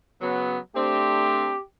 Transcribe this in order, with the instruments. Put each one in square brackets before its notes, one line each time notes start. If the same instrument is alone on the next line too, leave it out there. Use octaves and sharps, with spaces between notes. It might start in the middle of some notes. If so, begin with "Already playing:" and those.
[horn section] C#3 F#3 B3
[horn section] A3 C4 D4 [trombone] G4